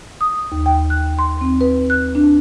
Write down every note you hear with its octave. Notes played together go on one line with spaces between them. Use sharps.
D#6
D#2
G5
F#6
C6
C4
B4
F#6
D4